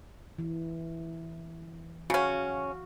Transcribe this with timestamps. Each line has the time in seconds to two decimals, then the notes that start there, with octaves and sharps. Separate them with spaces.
0.38 E3
2.10 C#3 C#4 F#4 F5